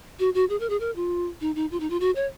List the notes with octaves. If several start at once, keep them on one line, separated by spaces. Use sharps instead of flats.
F#4
F#4
G#4
A#4
G#4
A#4
F4
D#4
D#4
F4
D#4
F4
F#4
C#5